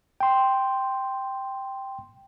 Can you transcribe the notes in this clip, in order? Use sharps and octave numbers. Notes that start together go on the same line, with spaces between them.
G5 C6